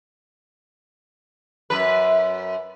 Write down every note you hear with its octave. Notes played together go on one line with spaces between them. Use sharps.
F#2 B4